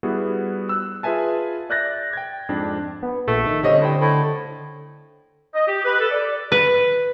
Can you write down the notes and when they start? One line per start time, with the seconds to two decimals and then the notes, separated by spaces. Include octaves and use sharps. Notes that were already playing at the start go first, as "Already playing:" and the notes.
0.03 G3 B3 E4 F#4 G#4
0.69 E6 F#6
1.03 F4 G#4 B4 E5 G#5 A5
1.70 D5 E5 F#6 G6 A6 A#6
2.13 G5 G#6
2.49 F2 G#2 D4
3.03 B3
3.27 A#1 A3
3.47 D#3
3.63 G2 D3 C4 C#4 D#5
3.81 A2 C5 G5
4.01 A2
5.54 D#5
5.68 G4
5.84 B4
5.99 A4
6.11 D5
6.52 B4